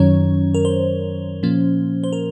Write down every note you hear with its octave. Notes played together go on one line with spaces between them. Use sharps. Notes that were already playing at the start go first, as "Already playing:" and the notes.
Already playing: F#2 D#3 F#3 C#4 C#5
A#4
C5
A#2 F3 A#3 C#4
C5
A#4